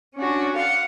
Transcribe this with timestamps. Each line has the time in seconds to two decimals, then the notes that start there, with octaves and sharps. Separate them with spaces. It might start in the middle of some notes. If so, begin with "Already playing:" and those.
0.15 C#4 D4 F#4
0.55 F5 F#5 C6